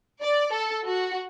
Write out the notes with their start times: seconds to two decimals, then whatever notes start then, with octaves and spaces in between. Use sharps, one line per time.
0.22 D5
0.53 A4
0.86 F#4